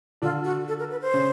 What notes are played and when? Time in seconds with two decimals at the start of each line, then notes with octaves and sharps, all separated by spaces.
0.22 D3 D4 F4
0.44 F#4
0.68 A4
0.79 A#4
0.91 B4
1.02 C5
1.13 C#3 C#4